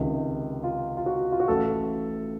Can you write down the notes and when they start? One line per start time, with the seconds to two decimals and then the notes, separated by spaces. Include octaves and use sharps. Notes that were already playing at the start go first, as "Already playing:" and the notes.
Already playing: C#2 C3 D#3
0.64 F4
0.97 F4
1.06 F#4
1.32 F4
1.40 F#4
1.48 A1 A2 A4